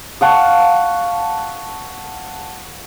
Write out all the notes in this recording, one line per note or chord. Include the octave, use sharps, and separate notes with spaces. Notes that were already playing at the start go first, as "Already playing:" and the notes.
F5 F#5 A5 C#6